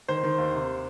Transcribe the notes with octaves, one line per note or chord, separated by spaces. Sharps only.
D#3 C5
D#3
D#2
C3